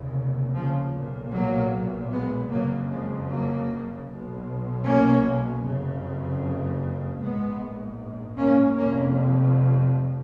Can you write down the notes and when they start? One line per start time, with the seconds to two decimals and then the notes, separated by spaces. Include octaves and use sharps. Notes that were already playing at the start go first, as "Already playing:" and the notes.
Already playing: F1 D#2 C#3
0.54 C#3 F3
0.94 B1 A#2
1.32 F#3 A#3
2.11 G#3 B3
2.50 F#1 F2 C#3 F#3 A#3
2.89 F3 G#3
3.28 F#3 A#3
4.07 B1 B2
4.85 A#3 C#4
5.63 F#1 F2 C#3
7.20 A#1 G#2 G#3 B3
8.37 A#3 C#4
8.77 F1 F2 A#3 C#4